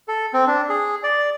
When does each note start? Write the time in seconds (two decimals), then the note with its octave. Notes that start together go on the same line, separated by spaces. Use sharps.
0.08 A4
0.33 C4
0.47 D4
0.69 G#4
1.03 D5